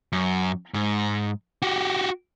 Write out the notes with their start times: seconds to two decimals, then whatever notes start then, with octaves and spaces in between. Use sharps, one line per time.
0.13 F#2
0.74 G#2
1.62 F#4 G4